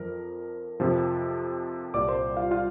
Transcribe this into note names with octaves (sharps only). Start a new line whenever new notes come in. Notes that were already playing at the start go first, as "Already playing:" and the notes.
Already playing: F2 F3 A#4
F2 C3 F3
C2 A#2 G3 D5 D6
C5 C6
F4 F5
F4 F5